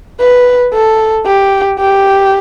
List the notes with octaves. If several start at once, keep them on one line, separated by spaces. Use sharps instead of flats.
B4
A4
G4
G4